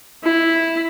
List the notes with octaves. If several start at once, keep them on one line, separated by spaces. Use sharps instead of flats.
E4